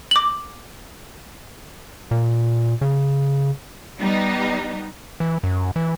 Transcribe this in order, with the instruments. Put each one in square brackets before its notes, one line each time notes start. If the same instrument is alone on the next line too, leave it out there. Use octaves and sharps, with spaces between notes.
[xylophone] D6 F#7
[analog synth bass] A#2
C#3
[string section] G3 B3 D#4
[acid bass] E3
F#2
E3